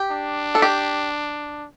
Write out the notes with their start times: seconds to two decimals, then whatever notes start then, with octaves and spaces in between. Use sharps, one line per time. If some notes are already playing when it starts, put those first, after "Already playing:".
Already playing: G4
0.11 D4
0.55 A4
0.62 G4